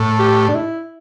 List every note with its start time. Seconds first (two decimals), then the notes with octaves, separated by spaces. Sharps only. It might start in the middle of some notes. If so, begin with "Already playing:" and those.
Already playing: A2
0.19 G4
0.48 D4
0.55 E4